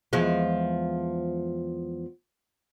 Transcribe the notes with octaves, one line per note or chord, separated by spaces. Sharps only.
E2 F3 G#3